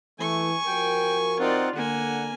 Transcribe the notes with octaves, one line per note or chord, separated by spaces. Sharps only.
E3 A3 G#5 C#6
F3 F#4 A#4 G5
C4 D#4 F4 D5 F#5
D3 A#3 F#5 G#5